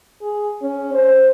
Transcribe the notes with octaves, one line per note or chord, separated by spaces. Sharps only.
G#4
C#4
C5